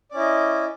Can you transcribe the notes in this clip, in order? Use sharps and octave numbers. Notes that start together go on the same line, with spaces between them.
C#4 E4 D5 D#5